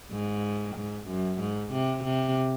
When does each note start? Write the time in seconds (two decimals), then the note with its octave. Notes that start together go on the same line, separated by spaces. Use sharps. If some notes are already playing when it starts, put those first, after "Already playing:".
0.11 G#2
0.75 G#2
1.08 F#2
1.40 G#2
1.72 C3
2.04 C3